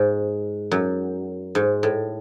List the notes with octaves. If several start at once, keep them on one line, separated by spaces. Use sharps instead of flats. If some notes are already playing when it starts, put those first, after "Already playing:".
Already playing: G#2
F#2
G#2
A2